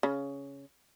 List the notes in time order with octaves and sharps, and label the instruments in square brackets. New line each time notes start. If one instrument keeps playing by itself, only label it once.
[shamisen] C#3